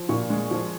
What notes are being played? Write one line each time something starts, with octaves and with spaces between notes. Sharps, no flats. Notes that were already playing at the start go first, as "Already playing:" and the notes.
Already playing: F3
A#2 C#6
G#3
F3